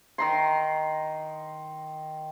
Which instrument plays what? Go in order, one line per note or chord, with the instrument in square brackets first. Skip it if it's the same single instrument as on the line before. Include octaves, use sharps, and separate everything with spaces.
[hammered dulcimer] D#3 A#5 C6